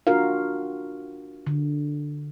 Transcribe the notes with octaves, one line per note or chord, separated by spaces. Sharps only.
D4 F4 F#4 A#4 F5
D3